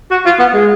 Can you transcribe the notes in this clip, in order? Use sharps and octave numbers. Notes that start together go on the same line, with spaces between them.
F#4
F4
B3
G#3